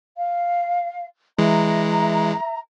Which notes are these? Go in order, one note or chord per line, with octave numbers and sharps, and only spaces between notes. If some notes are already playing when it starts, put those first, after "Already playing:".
F5
E3 G#3 E5 A#5